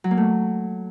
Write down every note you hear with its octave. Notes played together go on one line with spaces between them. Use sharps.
F#3
A#3
A3